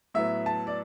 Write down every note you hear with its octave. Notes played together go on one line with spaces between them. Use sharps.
A2 F#3 B3 E5
A5
D5